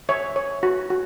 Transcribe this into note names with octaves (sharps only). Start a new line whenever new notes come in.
C#5 E5
C#5
F#4
F#4